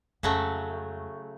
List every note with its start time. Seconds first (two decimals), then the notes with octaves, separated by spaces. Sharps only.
0.23 F2 C#3 F#3 G#3 A3